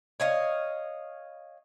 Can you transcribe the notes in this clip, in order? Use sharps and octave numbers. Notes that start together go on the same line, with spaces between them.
C#5 D#5 F5